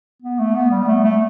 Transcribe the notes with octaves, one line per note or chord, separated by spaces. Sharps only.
B3
A3
B3
G3
B3
A3
A3